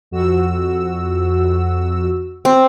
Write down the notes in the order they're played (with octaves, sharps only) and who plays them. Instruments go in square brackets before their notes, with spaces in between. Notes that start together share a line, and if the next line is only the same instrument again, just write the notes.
[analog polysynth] F2 F#4 E6
[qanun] C4